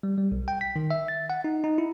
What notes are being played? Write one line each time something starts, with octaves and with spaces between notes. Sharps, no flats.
G3
G3
B1
G5
B6
D#3
E5
A6
F#5
D#4
D#4
E4